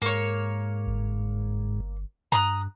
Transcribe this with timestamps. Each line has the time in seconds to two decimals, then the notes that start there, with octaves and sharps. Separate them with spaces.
0.02 G#2 A#3 C#5
0.87 G1
2.32 G2 A#5 D#6 F#6